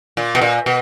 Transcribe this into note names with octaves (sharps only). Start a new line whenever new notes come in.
A#2
B2
A#2
B2